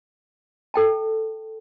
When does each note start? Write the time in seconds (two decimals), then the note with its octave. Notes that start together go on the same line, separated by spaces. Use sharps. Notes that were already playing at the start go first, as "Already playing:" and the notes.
0.74 A4 G5 A5